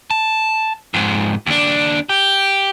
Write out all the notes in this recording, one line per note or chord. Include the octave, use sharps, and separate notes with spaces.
A5
F2 G#2
D#2 D4
G4